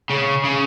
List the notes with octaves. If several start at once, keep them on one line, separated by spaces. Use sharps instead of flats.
C#3
C#3